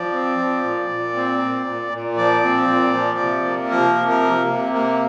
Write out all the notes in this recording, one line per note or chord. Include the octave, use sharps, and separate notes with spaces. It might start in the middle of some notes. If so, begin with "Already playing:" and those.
Already playing: F3 D5
C4
F3
A#2
A#2
C4
A#2
A#2
A#2
F3 D5
C4
A#2
F3
C3
A#3
F3 A#4
C3
A#4
A#3
C3
A#3